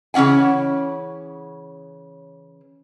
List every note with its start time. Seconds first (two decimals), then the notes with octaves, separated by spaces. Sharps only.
0.14 C#3 E3 C#4 F#5 G#5